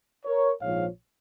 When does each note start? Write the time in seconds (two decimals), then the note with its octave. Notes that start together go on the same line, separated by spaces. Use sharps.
0.25 A#4 C#5
0.60 A#1 G#2 F3 C#5 F5